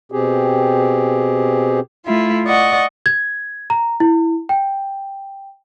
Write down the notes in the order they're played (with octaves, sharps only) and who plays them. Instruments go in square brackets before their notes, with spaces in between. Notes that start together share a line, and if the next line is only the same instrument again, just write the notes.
[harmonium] B2 C4 G4 G#4
[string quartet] A3 E4 F4
D5 D#5 F#5 C#6
[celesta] G#6
A#5
E4
G5